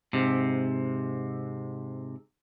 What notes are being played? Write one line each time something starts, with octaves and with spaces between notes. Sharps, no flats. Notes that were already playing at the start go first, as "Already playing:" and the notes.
G#2 C3